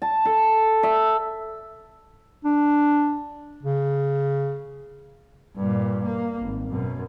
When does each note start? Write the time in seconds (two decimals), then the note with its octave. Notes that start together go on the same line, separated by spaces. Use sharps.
0.02 A5
0.25 A4
0.83 E5
2.45 D4
3.63 C#3
5.56 G2 A#2
6.04 A#3
6.41 G#1
6.70 F#2 B2